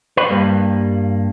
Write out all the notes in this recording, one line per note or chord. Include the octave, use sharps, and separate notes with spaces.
B4
G2 G3 A#3